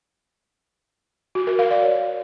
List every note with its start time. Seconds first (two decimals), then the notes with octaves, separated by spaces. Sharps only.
1.35 F#4
1.47 A#4
1.59 F5
1.71 D5
1.82 C#5